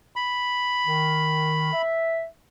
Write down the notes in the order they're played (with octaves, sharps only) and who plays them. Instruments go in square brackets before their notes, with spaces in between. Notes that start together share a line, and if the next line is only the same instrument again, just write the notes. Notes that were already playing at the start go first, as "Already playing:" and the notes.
[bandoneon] B5
[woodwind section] D#3
E5